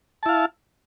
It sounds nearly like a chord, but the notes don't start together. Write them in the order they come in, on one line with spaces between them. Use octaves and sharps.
A5 E4 F5